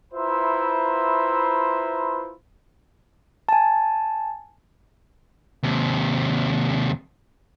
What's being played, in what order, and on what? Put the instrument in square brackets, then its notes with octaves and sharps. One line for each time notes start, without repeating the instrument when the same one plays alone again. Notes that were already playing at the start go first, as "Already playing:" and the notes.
[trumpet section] E4 F4 B4 C5 E5 A#5
[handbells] G#5 A5
[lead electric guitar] D#2 C3